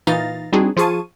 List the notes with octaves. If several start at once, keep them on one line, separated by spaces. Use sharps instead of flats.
A#2 E3 D#4 F5 A6 A#6
G3 C4 D4 D#4 F#4 G#4
F3 F4 G#4 A5 C#6 D#7